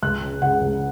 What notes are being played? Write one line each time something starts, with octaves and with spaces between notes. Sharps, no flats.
C#2 F#6
C#3
C#3 F#5
C#2